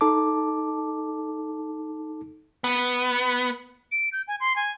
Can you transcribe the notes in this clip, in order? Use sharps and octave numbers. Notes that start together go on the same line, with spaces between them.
D#4 A4 A5 D6
B3
D7
G6
G#5
C6
G#5